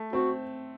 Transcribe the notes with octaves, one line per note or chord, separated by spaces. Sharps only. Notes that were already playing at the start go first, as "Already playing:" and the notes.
Already playing: A3
C4 F#4